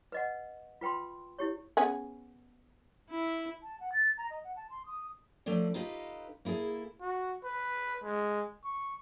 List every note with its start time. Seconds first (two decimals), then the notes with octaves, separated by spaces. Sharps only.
0.12 B4 D#5 F#5
0.81 F4 B4 G5 B5 C6
1.39 E4 G4 C#5
1.77 B3 C#4 G#4
3.10 E4
3.63 A5
3.80 F#5
3.92 A6
4.18 A#5
4.30 D#5
4.44 F#5
4.56 A5
4.70 C6
4.86 D#6
5.46 F3 A3 C4 C#4 D5
5.74 D#4 F4 G4 A4 B4 D#5
6.45 A#3 E4 G#4 A4
7.01 F#4
7.44 B4
8.03 G#3
8.64 C#6